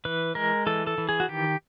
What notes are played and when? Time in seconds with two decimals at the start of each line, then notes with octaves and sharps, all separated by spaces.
0.05 E3 B4
0.35 G#3 A#4
0.66 E3 A4
0.87 A4
0.98 E3
1.09 G#4
1.20 F#4
1.29 D#3 G4